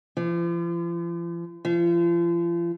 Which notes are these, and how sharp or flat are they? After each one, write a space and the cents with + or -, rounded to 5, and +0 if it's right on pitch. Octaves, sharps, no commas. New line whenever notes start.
F3 -45
F3 -40